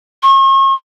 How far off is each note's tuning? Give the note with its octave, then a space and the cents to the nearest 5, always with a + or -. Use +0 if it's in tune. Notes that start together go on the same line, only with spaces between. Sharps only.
C#6 -40